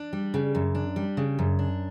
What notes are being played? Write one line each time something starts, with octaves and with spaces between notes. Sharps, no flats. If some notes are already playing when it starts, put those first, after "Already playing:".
Already playing: D4
G3
C#3
F#2
D4
G3
C#3
F#2
D4